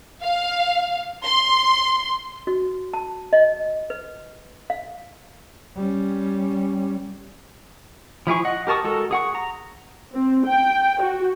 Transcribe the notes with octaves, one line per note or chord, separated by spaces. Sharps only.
F5
C6
F#4
A5
D#5
B4
F5
G3 C#4
F3 E4 G#4 C#6
D#5 F#5
G4 A#4 A5 C#6 D#6
G#3 F#4 A4 A#4
G#4 F#5 C#6
A#5
C4
G5
F#4